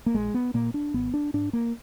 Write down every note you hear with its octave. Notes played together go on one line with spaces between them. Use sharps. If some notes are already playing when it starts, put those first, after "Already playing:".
A#3
A#1 G#3
B3
A#2 A#3
D4
G#1 B3
D4
G#2 D4
A#3